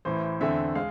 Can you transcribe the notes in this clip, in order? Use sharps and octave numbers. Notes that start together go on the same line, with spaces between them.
A1 A2 E3 C5
E2 D3 A3 C4 E5
G#3 F5